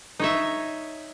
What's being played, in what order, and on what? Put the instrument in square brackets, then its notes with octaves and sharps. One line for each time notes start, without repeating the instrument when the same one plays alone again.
[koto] D#4 C#5 E5